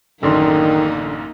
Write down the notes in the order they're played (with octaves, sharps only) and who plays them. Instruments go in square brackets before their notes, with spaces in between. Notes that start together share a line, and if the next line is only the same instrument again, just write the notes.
[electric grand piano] A1 F#2 C6 [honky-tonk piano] D3 [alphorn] D#3 [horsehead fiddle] A#3 D#4